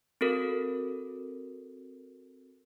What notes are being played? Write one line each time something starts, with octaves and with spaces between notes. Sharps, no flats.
C4 F#4 A4 A#4